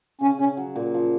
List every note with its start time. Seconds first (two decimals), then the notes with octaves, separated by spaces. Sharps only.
0.21 C#3 C#4
0.39 C#3 C#4
0.57 F#3
0.76 A#2
0.94 F3